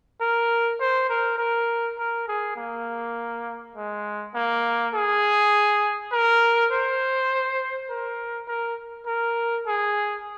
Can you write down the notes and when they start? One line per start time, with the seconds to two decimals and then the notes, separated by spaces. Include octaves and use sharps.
0.21 A#4
0.80 C5
1.10 A#4
1.38 A#4
1.98 A#4
2.28 G#4
2.57 A#3
3.76 G#3
4.34 A#3
4.94 G#4
6.12 A#4
6.71 C5
7.90 A#4
8.48 A#4
9.07 A#4
9.67 G#4